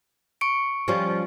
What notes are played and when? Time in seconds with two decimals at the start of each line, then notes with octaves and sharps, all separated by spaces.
0.41 C#6 C#7 D7
0.88 F3 G3 C#4